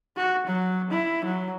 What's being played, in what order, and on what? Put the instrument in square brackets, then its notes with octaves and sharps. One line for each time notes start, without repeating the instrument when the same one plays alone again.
[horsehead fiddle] F#4
F#3
E4
F#3